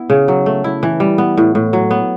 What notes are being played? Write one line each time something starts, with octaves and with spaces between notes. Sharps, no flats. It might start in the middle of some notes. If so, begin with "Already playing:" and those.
Already playing: B3 E4
C#3
F#3
A3
E4
E3
G3
B3
A2
A2
F#3
B3